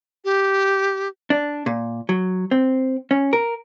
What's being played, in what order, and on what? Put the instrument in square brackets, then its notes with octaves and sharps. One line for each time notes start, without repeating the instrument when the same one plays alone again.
[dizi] G4
[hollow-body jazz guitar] D4
A#2
F#3
C4
C#4
A#4